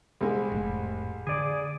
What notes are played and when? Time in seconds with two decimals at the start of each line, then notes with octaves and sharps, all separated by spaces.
0.21 C2 G#3
0.51 F1 A2
1.27 D3 G#4 D5